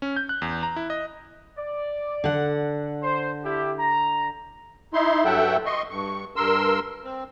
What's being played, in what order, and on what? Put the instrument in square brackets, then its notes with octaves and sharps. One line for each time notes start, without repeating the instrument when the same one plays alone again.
[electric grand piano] C#4
G6
F#6
E2
A#5
E4
D#5
[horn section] D5
[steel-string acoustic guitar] D3 F#5
[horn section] C5
D4 E4 G4
A#5
[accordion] D#4 E4 C6
G2 F#3 A4 E5 F#5 G5
D#5 C6 C#6
G2 C#6
G2 A#4 C6 E6
C4